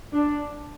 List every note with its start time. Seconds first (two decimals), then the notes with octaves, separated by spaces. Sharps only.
0.14 D4